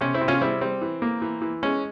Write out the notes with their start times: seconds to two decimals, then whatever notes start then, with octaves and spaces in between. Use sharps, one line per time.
0.01 C3 C#4
0.14 C4 E4
0.21 C3
0.28 C#4 F4
0.41 G3 C4 E4
0.61 G3 C4
0.81 E3
1.02 A#3
1.22 E3
1.42 E3
1.63 G#3 C#4